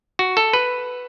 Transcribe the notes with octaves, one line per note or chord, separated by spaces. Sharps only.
F#4
A4
B4